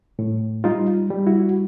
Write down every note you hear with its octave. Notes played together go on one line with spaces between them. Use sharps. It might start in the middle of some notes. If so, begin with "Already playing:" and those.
A2
G3 D#4 F4
G3
E4 F#4